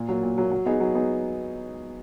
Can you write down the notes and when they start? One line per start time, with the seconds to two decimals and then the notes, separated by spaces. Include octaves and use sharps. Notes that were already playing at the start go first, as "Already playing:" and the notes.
Already playing: A#2
0.09 F#3 A#3
0.23 A#2
0.38 F#3 A#3
0.51 F#3
0.66 B3 D#4 G#4
0.80 F#3
0.95 B3 D#4 G#4